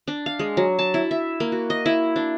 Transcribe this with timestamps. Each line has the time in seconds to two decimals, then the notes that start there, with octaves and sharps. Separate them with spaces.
0.08 D4
0.26 F5
0.39 G#3
0.57 F#3
0.79 A5
0.94 E4
1.11 E5
1.40 A#3
1.52 F#4
1.70 D#5
1.86 E4
2.16 D4